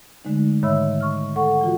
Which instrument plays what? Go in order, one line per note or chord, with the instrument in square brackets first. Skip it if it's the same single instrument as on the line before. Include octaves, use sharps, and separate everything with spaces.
[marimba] D3 G#3 A3 D#4
G#2 D#3 C#5 E5 B5 E6
C#6 F6
A4 F#5 C#6
E3 F4 F#4